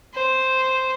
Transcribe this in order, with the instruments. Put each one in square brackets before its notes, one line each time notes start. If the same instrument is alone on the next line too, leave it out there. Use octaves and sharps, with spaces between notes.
[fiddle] C5